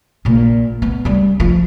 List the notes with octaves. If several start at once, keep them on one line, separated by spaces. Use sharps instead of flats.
A#1 A#2
B3
G3 C#4
F3 F4